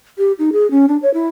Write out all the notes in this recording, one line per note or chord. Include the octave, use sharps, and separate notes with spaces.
G4
D#4
G#4
C#4
D4
C#5
E4